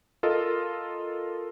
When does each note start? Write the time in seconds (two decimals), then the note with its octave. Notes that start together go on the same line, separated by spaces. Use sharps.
0.23 F4 A4 A#4 D#5